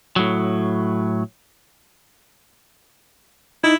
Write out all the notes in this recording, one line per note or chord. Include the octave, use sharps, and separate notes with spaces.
A2 F#3
D#4 E4